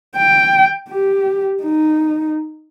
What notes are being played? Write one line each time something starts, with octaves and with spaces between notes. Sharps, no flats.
G5
G4
D#4